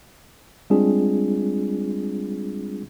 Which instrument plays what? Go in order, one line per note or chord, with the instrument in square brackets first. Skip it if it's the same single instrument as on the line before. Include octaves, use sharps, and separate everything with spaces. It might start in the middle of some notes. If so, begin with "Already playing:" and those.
[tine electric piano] G3 G#3 C4 D4 F4 G#4